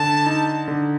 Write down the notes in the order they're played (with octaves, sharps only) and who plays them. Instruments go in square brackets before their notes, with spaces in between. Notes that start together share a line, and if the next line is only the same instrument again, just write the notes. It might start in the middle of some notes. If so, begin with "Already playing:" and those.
Already playing: [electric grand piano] D3 [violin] A5
[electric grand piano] D#4
D3